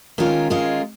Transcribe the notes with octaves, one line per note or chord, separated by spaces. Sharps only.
D#3 G#3 C#4 F4 A#4
D#3 G#3 C#4 F4 A#4